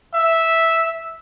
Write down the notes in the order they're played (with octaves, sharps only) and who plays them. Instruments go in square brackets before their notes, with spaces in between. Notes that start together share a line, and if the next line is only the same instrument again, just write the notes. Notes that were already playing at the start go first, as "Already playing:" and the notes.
[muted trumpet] E5